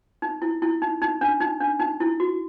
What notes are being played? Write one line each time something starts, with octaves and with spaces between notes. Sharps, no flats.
D#4
E4
E4
D#4
D#4
D4
D#4
D4
D#4
E4
F#4